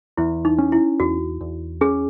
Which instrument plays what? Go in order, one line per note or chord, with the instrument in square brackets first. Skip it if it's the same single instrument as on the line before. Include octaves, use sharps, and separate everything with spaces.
[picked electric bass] E2 [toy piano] E4
[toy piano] D#4
[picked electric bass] C#4
[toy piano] E4
[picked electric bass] E2 [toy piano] F#4
[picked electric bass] E2
[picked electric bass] C#4 [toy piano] G#4